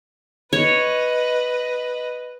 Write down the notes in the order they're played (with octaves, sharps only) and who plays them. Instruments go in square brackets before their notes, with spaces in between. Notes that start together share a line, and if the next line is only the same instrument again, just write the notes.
[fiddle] B4 D#5 [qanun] C#5